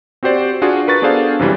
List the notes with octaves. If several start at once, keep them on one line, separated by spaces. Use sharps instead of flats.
C4 F#4 G4 C5 D5
D4 F4 F#4 G#4
A#4 B4 C#6 A6
B3 D4 G#4 A4 C5 F5
F#2 C3 E3 G3